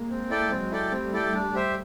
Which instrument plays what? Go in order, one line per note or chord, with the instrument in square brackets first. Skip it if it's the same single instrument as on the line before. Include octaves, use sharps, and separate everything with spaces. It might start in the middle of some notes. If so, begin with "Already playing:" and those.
Already playing: [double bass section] G#3 A#3
[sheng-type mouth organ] C4
E4 A4 D5 G5
[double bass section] F#3 G#3 [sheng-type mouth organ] C4
[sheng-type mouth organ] E4 A4 D5 G5
[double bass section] G3 A3 [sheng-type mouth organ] C4
[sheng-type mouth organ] E4 A4 D5 G5
D4
G4 C5 E5